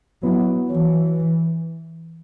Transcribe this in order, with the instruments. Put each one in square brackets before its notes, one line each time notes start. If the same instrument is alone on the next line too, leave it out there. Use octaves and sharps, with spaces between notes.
[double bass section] F#3 [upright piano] B3 E4
[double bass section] E3 [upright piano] F#3